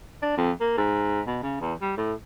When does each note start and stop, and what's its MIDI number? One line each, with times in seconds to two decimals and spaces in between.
0.22 0.35 62
0.37 0.52 41
0.61 0.74 58
0.77 1.21 44
1.27 1.38 47
1.43 1.60 49
1.61 1.74 40
1.81 1.96 55
1.97 2.14 45